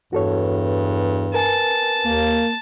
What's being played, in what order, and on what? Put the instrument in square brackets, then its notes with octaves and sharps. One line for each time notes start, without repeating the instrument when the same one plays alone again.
[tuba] E2 [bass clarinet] G2 [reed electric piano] F#4 A4 C#5
[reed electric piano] A#4 B4 G#5 [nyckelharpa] A5
[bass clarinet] D#2 [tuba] A#3